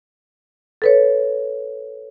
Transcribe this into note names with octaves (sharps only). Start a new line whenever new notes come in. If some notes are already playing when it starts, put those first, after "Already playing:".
A4 B4 C#5